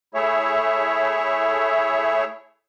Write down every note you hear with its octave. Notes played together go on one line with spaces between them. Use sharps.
A3 E4 G#4 C#5 E5